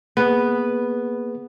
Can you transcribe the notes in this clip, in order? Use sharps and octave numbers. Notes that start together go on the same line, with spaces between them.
A#3 B3 G#4 B4